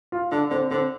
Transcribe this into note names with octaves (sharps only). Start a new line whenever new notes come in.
F4
D3 D4
D3 C4
D3 C4